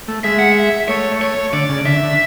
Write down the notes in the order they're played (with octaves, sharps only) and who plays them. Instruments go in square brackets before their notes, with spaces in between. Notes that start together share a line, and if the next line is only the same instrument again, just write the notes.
[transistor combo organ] A3
[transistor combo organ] G#3 [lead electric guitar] E5
[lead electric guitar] F#5
E5
[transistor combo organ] A3 [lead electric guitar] C#5
[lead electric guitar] C#5
[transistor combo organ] D3 [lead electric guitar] D5
[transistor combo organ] C#3
[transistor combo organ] D3 [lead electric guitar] E5
[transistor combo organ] D3